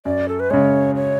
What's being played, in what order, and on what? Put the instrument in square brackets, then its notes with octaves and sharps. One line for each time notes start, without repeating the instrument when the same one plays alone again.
[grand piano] F#2 [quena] D5
[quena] A4
B4
[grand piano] C#3 G#3 [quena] C#5
[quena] C#5